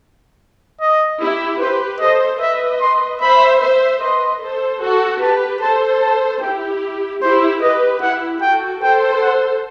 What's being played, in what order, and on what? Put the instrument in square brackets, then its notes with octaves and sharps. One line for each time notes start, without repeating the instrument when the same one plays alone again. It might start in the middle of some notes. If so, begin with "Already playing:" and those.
[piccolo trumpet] D#5
[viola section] E4 G4
[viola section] G4 B4 [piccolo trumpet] C5
[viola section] A4 C5 [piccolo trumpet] D#5
[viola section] B4 D#5 [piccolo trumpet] E5
[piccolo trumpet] C6
[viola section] C5 E5 [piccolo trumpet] B5
[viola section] C5 E5
[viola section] B4 D#5 [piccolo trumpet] C6
[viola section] A4 C5
F#4 A4
[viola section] G4 B4 [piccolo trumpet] A5
[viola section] A4 C5 [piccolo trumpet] A5
[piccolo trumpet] A5
[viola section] E4 G4 [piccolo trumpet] G5
[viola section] E4 G4 [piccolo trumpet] C5
[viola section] G4 B4 [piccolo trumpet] D#5
[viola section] E4 G4 [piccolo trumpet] F#5
[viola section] F#4 A4 [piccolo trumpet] G5
[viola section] A4 C5 [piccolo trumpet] G5
[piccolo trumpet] F#5